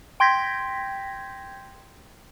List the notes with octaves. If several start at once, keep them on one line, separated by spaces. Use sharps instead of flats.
G5 C6 G6 G#6 A#6 B6